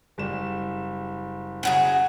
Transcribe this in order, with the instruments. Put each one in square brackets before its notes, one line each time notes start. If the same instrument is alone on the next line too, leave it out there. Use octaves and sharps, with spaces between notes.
[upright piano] F#1 G3 E7
[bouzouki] C#3 F#3 G#4